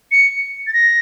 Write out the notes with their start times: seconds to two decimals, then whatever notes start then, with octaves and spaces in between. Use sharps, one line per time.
0.12 C#7
0.67 A6
0.73 A#6